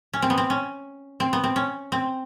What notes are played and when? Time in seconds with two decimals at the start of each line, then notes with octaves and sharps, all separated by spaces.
0.13 C#4
0.22 C4
0.30 B3
0.38 C4
0.50 C#4
1.20 C4
1.33 B3
1.44 C4
1.56 C#4
1.92 C4